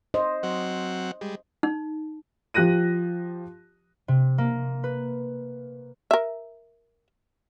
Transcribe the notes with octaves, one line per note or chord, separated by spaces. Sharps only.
C5 D#5
F#3 C4 F#5
G3 G#3
D#4
F3 G4 F#6 A#6 D#7
C3
A#3
B4
A#4 E5